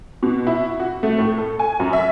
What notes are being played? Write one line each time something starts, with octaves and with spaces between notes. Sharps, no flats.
B2
E4
F#4
A3
A2
A4
G#5
F#2
E5